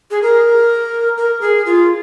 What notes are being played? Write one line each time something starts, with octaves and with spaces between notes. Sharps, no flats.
G#4
A#4
A#4
G#4
F4